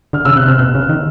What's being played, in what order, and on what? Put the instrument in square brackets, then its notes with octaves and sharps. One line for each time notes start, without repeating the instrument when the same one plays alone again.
[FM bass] D3 [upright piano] F6
[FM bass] C#3 [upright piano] E6
[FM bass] C3 [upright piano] F#6
[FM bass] C3 [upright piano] F6
[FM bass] B2 [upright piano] F#6
[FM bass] C#3
D#3